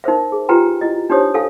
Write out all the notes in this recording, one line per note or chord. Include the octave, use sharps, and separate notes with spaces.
D#4 A#4 C5 E5
G#4
F4 G4 B4 G5 G#5 A#5
E4 D#5
D4 D#4 G4 C5 C#5 D#6
A4 F5 G#5